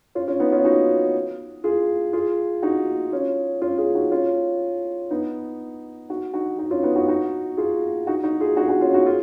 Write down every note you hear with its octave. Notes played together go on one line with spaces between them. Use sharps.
C#4 F4
C#4 F4
B3 D#4
C#4 F4
D#4 F#4
F4 G#4
F4 G#4
D#4 F#4
C#4 F4
C#4 F4
F4 G#4
D#4 F#4
C#4 F4
B3 D#4
D#4 F#4
D#4 F#4
D#4 F#4
C#4 F4
B3 D#4
D#4 F#4
D#4 F#4
F4 G#4
D#4 F#4
D#4 F#4
F4 G#4
D#4 F#4
G#4
D#4 F#4
C#4 F4
D#4 F#4
F4 G#4